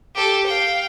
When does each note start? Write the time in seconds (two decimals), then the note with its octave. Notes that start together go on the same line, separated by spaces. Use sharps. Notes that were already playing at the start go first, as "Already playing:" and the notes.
0.15 G4 A4
0.46 F5 G5